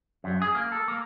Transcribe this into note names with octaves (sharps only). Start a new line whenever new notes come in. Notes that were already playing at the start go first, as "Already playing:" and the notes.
F#2
G#4
A#3
A4
A#3